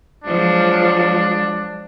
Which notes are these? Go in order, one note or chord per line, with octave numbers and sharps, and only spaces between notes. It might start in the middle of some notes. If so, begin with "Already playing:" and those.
F3 F#3 G#3 D4